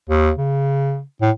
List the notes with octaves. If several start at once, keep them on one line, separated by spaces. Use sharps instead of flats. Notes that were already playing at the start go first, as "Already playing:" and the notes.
D#2
C#3
A2